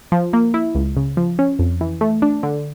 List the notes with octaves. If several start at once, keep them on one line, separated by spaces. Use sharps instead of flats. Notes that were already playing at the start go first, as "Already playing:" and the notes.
F3
A#3
E4
C#2
C#3
F3
C#4
F2
E3
A3
D4
D3